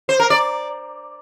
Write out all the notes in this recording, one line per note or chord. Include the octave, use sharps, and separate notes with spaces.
C5
A#4
D5